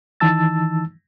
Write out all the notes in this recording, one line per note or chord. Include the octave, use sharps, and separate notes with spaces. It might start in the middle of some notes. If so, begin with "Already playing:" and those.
D#3 E3 D#4 A5 E6 A6